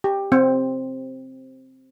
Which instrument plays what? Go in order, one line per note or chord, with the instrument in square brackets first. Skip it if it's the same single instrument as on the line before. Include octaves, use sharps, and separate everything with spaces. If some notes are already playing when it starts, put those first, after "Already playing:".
[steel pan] G4
C4